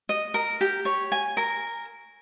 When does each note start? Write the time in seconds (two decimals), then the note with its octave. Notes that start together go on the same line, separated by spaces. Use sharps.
0.09 D#5
0.34 A#4
0.61 G4
0.85 C#5
1.12 G#5
1.37 A#4